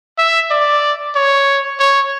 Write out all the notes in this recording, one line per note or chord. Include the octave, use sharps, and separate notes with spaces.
E5
D5
C#5
C#5